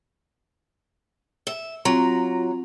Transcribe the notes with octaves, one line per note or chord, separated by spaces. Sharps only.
E5
F#3 C4 F4 A#5